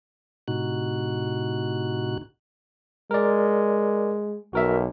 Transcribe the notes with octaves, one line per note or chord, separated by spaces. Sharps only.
A2 C3 D#4 F#4 F#6
G#3 A#4 D5
B1 F#4 A#4 E5